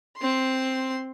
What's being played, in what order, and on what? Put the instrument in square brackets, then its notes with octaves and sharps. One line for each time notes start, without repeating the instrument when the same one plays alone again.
[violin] C4 C6